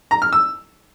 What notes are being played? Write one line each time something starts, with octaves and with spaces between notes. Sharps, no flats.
A#5
F6
E6